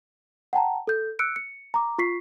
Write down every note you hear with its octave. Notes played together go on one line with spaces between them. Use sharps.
F#5 G5 A5 A#5
A4 G6
E6 F#6 C#7 D7
C#7
A#5 D6
F4 C#6 B6 C7